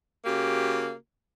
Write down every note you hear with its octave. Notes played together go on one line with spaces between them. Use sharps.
C#3 A#3 F#4 G4